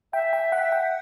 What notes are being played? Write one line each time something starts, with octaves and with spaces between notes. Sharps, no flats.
E5 G5
G5
F#5
G5